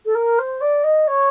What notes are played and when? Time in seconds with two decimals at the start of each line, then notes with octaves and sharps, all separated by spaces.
0.05 A4
0.14 A#4
0.38 C5
0.60 D5
0.83 D#5
1.07 C#5